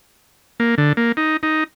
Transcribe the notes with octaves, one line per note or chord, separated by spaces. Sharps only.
A#3
D3
A#3
D#4
D#4